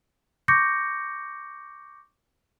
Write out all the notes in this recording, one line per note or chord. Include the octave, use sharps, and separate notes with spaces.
C#6 D6 G6 A#6 C#7